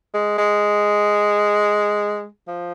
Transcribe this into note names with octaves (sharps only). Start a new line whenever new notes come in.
G#3
G#3
F3